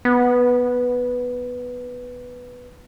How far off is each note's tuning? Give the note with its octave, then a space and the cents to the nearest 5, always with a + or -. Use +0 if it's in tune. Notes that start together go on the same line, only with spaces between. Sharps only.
B3 +0